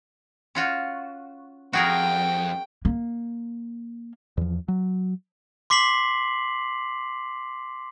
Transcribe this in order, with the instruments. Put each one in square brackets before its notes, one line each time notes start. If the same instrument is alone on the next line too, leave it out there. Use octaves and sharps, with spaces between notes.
[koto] C#4 F4 F#4
[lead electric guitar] F2 [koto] F#4 G#4 A#4 [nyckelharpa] G5
[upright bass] A#3
[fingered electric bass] E2 F3
F#3
[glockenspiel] C6 D6 B6 C7 F#7